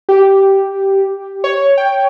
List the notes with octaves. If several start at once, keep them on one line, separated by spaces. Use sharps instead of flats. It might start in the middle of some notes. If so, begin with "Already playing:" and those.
G4
C#5
G5